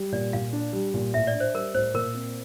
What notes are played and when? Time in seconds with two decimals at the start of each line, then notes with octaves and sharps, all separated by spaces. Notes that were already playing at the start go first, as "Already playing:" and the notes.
Already playing: G3
0.12 A#2 D5
0.33 A#2 F5
0.53 D4
0.73 G3
0.94 A#2
1.14 A2 E5
1.27 D5
1.34 D4
1.40 C5
1.54 G3 A#4
1.74 A2 C5
1.94 A#2 A#4
2.14 C4